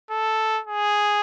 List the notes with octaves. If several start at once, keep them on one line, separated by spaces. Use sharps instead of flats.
A4
G#4